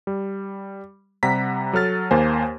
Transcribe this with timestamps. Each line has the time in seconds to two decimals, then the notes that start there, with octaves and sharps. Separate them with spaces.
0.07 G3
1.23 C3 G3 F#5 A#5 B6
1.73 F#3 A4 F6 A6
2.11 D#2 A#3 C5 G#5